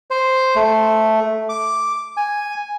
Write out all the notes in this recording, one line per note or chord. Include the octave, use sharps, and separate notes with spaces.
C5
A3
D6
G#5